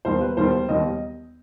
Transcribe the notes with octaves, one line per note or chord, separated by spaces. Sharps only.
E1 D#2 D#3 G3 C5
B4
E1 D#2 D#3 G3 C5
E1 D#2 D#3 G3 D#5